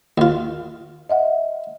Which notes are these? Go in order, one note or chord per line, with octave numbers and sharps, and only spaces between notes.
D#2 F4
D#5 E5 F#5